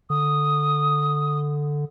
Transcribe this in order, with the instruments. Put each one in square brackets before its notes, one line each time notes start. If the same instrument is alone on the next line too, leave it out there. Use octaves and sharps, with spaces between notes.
[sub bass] D3 [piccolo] D#6